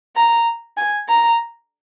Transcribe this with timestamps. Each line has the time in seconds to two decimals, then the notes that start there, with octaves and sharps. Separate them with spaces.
0.16 A#5
0.77 G#5
1.09 A#5